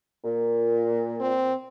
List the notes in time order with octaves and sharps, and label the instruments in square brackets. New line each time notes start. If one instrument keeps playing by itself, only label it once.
[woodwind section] A#2
[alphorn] C4